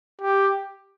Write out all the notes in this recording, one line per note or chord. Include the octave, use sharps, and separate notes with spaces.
G4